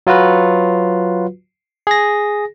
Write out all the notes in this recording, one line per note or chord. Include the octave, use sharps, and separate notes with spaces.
F#3 F4 F#4 B4
G#4 A#6